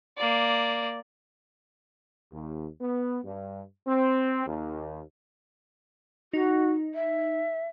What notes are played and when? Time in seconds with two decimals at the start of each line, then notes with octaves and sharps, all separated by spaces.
0.17 A#3 D5
2.32 D#2
2.81 B3
3.24 G2
3.87 C4
4.47 D#2
6.33 D#4 F#4
6.95 E5